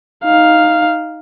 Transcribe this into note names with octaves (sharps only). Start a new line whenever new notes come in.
D#4 F5